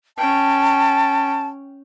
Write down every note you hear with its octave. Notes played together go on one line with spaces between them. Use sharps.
C#4 G5 A5